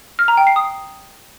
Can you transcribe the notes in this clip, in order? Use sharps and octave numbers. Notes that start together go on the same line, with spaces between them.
F6
A#5
G5
C7
D#6